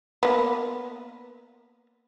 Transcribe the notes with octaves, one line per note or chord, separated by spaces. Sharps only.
A#3 B3